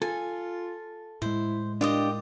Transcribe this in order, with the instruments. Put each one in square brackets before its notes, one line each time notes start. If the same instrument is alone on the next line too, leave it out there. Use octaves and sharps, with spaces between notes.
[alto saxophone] F4 [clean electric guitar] A4 [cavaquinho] G#5
[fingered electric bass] A2 G#3 [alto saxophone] E4 [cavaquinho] C5
[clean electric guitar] D4 [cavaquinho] F4 G4 D#5 [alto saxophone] A#4